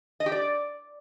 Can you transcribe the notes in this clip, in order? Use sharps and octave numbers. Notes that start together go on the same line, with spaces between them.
D#5
G4
D5